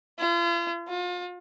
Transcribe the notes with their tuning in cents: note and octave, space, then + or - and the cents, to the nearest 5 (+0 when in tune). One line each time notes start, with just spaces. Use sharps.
F4 -40
F4 +35